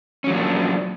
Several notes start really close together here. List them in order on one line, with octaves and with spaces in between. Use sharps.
C#4 F#3 F3 A#3 D4